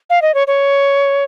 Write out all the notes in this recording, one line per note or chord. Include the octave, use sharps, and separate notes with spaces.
F5
D#5
C#5
C#5